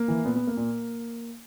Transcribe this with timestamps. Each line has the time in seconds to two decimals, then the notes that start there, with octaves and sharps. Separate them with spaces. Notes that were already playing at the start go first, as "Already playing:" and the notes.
Already playing: A#3
0.08 E3
0.24 A#2 B3
0.36 B3
0.47 A#3
0.57 A#2